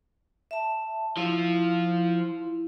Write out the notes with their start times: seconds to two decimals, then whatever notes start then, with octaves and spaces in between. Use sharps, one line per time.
0.51 E5 A5
1.17 F3 E4 F4